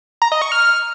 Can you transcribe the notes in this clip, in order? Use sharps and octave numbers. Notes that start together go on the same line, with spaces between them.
A#5
D#5
C#6
F6